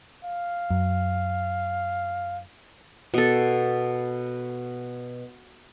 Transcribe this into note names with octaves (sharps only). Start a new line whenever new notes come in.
F5
F#2
B2 A4